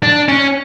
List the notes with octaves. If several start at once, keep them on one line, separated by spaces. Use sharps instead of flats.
D4
C#4